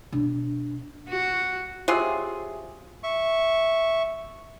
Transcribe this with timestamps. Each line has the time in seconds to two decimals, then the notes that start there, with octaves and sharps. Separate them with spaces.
0.12 B2 D4
1.09 F#4
1.88 C3 F#3 F4 G#4
3.03 E5 C#6